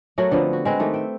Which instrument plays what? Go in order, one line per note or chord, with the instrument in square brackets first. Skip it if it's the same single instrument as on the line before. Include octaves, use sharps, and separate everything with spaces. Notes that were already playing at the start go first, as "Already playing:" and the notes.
[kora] F#3 A3 F#4 A#4
D3 F3 B3 C4
F#4
G#3 C4 B4
D#3 A3 G4
E5 G5